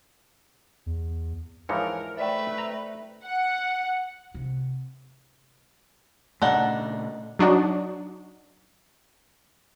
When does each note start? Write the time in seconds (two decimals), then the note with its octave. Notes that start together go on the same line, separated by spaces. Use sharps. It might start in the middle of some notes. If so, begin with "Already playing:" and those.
0.86 E2
1.69 G#2 E3 F3 A#4 C#5 C#7
2.17 A3 B4 C5 D5 E5 G5
2.58 A#5
3.24 F#5
4.34 C3
6.42 A#2 C#3 A3 D4 D#4 F#5
7.39 F#3 D4 D#4 F#4